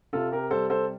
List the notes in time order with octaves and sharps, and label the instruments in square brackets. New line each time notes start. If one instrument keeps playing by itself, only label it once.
[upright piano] C3 F4 A4
G4 A#4
G3 A4 C5
A4 C5